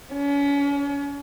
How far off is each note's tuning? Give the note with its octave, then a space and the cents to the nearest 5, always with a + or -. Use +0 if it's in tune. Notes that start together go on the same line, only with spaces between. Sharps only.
C#4 +35